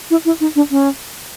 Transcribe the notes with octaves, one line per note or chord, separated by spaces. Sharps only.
E4
E4
D#4
D4
C#4